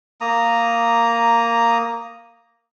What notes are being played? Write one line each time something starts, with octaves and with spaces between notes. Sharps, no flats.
A#3 A#5 D#6